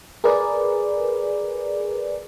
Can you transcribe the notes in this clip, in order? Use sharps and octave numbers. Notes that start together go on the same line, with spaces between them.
G#4 A#4 B4 D5